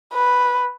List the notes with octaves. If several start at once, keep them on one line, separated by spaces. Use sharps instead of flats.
B4